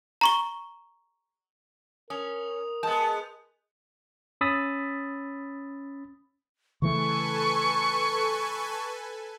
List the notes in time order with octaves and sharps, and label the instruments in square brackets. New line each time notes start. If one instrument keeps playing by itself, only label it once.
[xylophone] A#5 C#6 G7
[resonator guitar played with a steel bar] C#4 [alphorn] A#4 [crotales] D#6 F7
[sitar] G#3 B3 [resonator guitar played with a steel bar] A5 [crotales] G6
[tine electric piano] C#4 B5 D#6 E6 A6 B6
[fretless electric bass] C#3 E3 A3 [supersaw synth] A4 B4 G#5 [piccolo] C#6